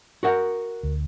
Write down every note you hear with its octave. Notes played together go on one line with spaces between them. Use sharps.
F#4 A#4 F#5
D2